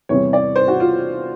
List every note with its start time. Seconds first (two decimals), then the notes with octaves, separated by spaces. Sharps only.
0.09 E2 C3 E3 G3 C4 C#5
0.33 D5
0.56 C5
0.68 F#4
0.80 F4